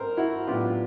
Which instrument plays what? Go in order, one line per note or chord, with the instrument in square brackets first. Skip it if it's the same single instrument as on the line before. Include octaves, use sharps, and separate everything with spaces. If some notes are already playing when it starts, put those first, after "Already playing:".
Already playing: [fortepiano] G#1 G#2 A#4 C5
E4 F#4
A2 F#3 B3 D4 F4 G4